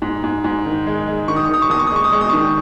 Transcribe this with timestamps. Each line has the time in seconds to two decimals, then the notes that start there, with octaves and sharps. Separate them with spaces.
0.02 G#2
0.24 G#2
0.44 G#2
0.66 D#3
0.86 G#3
1.07 G#3
1.28 D#3 C#6
1.36 D#6
1.45 C#6
1.49 D#3 D#6
1.62 C#6
1.70 D#2 D#6
1.79 C#6
1.87 D#6
1.91 G#3 C#6
2.04 D#6
2.12 G#3 C#6
2.21 D#6
2.29 D#3 C#6